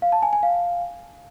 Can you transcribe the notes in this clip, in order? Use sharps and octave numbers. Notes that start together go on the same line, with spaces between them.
F5
A5
G#5
G#5
F5